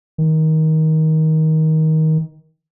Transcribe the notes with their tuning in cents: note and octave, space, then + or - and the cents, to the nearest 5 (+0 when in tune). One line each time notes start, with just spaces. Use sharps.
D#3 +20